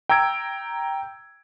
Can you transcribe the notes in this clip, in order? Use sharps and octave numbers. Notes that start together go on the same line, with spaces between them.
G5 A#5 E6 G#6 D7